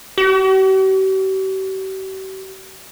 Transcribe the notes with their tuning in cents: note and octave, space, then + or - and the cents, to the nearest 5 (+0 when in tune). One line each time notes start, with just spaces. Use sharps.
G4 -45